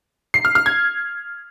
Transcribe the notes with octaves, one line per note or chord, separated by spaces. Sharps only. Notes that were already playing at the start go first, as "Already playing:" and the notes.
C7
F6
F6
G#6